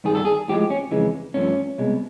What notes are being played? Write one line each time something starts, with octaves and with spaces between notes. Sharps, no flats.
G2 D#3 G3 G#4
A4
G#4
A2 F3 G#3 G4
C#4
F2 C#3 E3 G#3
G2 D3 F3 A3 C#4
C2 B2 G#3